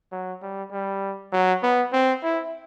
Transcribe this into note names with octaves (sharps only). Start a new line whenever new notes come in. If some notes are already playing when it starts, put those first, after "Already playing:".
F#3
G3
G3
F#3
B3
C4
E4